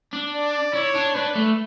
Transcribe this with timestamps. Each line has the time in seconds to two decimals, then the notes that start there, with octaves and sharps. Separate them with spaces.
0.13 D4
0.33 D5
0.74 E4 C#5
0.95 D4
1.15 D4 B4
1.35 A3